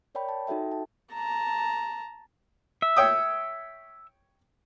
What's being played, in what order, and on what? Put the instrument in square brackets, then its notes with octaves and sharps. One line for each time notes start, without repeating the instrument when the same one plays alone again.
[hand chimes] A#4 C#5 D5 G5 B5
A5
D#4 F#4 A4 E5 G5
A5
[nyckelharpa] A5 A#5
[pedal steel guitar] E5
[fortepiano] C#5 G5 D#6